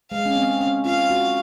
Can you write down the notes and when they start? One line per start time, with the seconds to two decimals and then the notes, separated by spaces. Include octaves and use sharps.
0.11 G#3 F5
0.26 C#4
0.36 C4
0.61 C#4
0.85 F4 F5
1.10 F#4